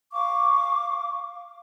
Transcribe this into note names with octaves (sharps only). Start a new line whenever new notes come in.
F5 C#6 D6